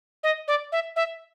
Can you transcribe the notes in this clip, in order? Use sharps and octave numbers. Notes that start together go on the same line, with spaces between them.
D#5
D5
E5
E5